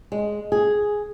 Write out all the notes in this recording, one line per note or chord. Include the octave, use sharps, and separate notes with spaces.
G#3
G#4